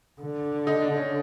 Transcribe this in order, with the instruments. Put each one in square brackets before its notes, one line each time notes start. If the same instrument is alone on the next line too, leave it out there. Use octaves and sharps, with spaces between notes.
[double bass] D3
[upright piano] D#4
D4
C#4